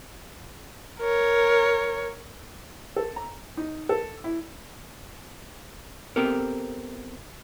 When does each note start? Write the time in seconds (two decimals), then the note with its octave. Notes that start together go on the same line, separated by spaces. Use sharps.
1.00 A#4 C#5
2.96 A4
3.16 A#5
3.57 D#4
3.89 A4
4.24 E4
6.16 B3 C4 G4 A4 A#4